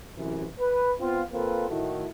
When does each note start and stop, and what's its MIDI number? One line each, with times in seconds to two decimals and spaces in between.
0.17 0.46 33
0.17 0.46 42
0.17 0.46 48
0.17 0.46 52
0.59 0.91 71
1.00 1.23 59
1.00 1.23 60
1.00 1.23 65
1.32 1.67 58
1.32 1.67 60
1.32 1.67 65
1.32 1.67 69
1.32 1.67 71
1.69 2.08 45
1.69 2.08 51
1.69 2.08 57
1.69 2.08 64
1.69 2.08 66